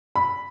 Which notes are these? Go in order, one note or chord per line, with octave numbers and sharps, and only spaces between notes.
B5